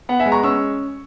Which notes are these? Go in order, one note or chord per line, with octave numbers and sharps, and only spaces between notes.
B3 F#5
E5 G#5
G#3
A#5 C#6
C#4 C#6 E6